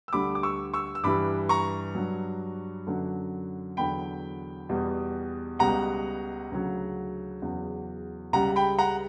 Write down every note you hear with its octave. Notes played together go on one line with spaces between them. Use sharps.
E6
D2 D3 G3 B5 D6
D6
C#6 E6
C#6 E6
E6
G2 E3 G3 B5 D6
A#5 C#6
G2 F#3
F#2 D3 F#3
E2 D3 F#3 G5 B5
E2 B2 G3
C#2 B2 G3 F#5 A#5
D2 C#3 F#3
E2 C#3 F#3
C#2 C#3 G3 F#5 A#5
G5 B5
F#5 A#5